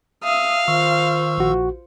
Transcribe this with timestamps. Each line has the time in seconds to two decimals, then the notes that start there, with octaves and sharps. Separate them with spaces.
0.24 E5 F5 D#6
0.68 D#3 F4 C5 C#6 E6
1.38 A#1 F#4